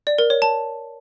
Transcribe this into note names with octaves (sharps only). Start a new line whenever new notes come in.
D5
A#4
C#5
A5